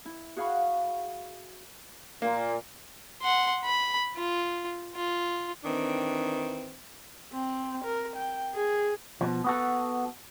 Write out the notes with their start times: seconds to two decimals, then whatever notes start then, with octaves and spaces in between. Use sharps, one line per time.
0.05 E4
0.36 F#4 G#4 F5 F#5 B5 C#6
2.22 A#2 A#3
3.22 F#5 C6
3.65 B5
4.16 F4
4.95 F4
5.64 D#3 E3 C4 D4
7.33 C4
7.84 A#4
8.16 G5
8.55 G#4
9.21 B2 F3
9.44 B3 F#4 A4